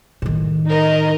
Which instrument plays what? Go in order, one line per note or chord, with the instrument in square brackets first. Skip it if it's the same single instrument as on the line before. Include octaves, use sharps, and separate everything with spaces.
[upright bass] A2 D#3
[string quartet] D#4 A#4 D#5